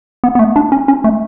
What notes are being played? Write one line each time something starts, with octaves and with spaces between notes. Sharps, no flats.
B3
B3
A3
D4
C#4
C#4
A3